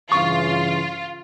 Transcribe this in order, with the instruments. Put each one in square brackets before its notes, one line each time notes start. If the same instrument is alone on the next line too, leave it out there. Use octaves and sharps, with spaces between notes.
[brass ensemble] G2 C#3 E3 [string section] F4 [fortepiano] C#6